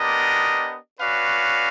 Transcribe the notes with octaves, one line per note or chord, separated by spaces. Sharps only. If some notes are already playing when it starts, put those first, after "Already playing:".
Already playing: B3 D4 G4 A#4 D#5
C#4 F#4 B4 D5 F5